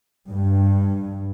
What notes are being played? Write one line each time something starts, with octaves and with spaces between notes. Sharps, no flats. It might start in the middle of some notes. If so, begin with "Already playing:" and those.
G2